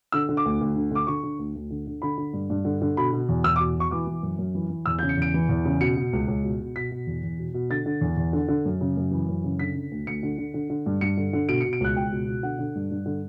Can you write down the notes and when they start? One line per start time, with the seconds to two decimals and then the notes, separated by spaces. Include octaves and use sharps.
0.12 D3 E6
0.29 D3
0.37 D6
0.45 D2
0.61 D2
0.76 D3
0.91 D3 D6
1.07 D3 C#6
1.23 D3
1.39 D2
1.55 D2
1.70 D3
1.87 D3
2.02 D3 B5
2.18 D3
2.33 G2
2.50 G2
2.65 D3
2.82 D3
2.97 B2 B5
3.13 B2
3.29 E2
3.44 E2 E6
3.56 D6
3.60 B2
3.76 B2 C#6
3.91 E3 D6
4.07 E3
4.22 F#2
4.38 F#2
4.55 E3
4.70 E3
4.86 E2 E6
4.99 G6
5.03 C#3
5.09 C#7
5.17 E2 D7
5.34 E3
5.49 E2
5.65 C#3
5.80 B2 C#7
5.97 B2
6.13 C#2
6.28 C#2
6.43 B2
6.60 B2
6.76 B2 B6
6.91 B2
7.07 E2
7.23 E2
7.39 B2
7.54 B2
7.70 D3 A6
7.86 D3
8.01 E2
8.17 E2
8.33 D3
8.48 D3
8.65 F#2
8.81 C#3
8.97 F#2
9.11 E3
9.28 F#2
9.44 C#3
9.59 D3 B6
9.75 D3
9.91 D2
10.07 D2 C#7
10.23 D3
10.38 D3
10.54 D3
10.70 D3
10.86 G2
11.01 G2 C#7
11.17 D3
11.33 D3
11.49 B2 D7
11.61 C#7
11.65 B2
11.73 D7
11.80 C#2 F#6
11.96 C#2 G5
12.11 B2
12.27 B2
12.43 D3 F#5
12.59 D3
12.75 G2
12.91 G2
13.06 D3